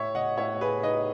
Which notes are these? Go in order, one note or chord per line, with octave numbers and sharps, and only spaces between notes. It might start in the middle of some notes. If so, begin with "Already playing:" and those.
Already playing: A2 C#5 E5
D#5 F#5
A2 C#5 E5
G#4 B4
D#4 B4 D#5